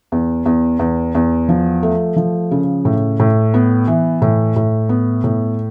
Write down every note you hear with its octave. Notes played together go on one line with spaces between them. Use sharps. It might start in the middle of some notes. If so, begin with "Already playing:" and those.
E2
E2
E2
E2
F3
A3
F3
C#3
A2
A2
B3
E3
A2
A2
B3
A2